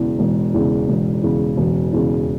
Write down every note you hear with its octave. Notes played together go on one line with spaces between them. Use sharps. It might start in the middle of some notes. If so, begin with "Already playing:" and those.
Already playing: E1 E2 C#3
E1
E2 C#3
E1
E2 C#3
E1
E2 C#3